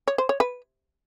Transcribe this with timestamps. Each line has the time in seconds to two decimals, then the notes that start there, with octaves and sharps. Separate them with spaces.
0.08 C#5
0.18 C5
0.29 C#5
0.40 B4